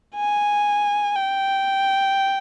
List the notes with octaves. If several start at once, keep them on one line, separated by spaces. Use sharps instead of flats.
G#5
G5